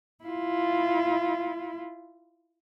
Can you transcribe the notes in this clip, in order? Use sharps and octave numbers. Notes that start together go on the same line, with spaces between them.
E4 F4